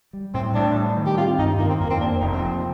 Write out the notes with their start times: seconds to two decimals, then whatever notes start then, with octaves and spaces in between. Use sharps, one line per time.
0.13 G3
0.34 A2 C4
0.55 A2 D4
0.75 G3
0.96 D#3
1.06 G4
1.18 C4 F4
1.38 G2 D#4
1.59 D#3 A#3
1.69 C4
1.80 F2 A#3
1.91 C4
2.00 A#3 D4
2.21 F1 D#4
2.32 C4
2.42 F3